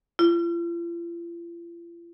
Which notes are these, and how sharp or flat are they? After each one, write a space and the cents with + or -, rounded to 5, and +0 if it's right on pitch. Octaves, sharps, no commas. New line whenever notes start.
F4 -45